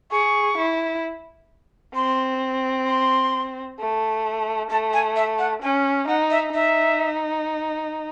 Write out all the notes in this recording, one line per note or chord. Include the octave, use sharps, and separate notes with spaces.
G#4 C#6
E4
C4 C6
C6
A3
A3 A5
G#5
E5
F#5
C#4 G#5
D#4 F#5
E5
D#4 E5